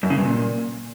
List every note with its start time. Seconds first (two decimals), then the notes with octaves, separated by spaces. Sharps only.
0.03 F#2
0.10 C#3
0.18 G2
0.25 A#2